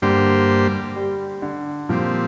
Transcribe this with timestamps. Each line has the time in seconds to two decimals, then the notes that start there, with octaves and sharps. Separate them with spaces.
0.02 G2 D3 G3 A#3 G4 C5
0.96 G3
1.42 D3
1.89 A#2 F3 G3 C4